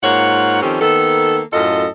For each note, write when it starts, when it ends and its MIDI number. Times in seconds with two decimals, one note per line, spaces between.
0.04 0.61 44
0.04 0.61 58
0.04 0.61 65
0.04 0.61 73
0.04 0.61 78
0.63 0.81 51
0.63 0.81 53
0.63 0.81 60
0.63 0.81 61
0.63 0.81 67
0.63 0.81 69
0.81 1.41 51
0.81 1.41 58
0.81 1.41 59
0.81 1.41 69
1.53 1.87 42
1.53 1.87 45
1.53 1.87 65
1.53 1.87 69
1.53 1.87 75